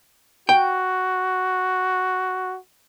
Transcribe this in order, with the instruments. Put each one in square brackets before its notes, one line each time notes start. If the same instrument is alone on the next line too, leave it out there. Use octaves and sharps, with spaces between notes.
[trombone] F#4 [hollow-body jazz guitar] G5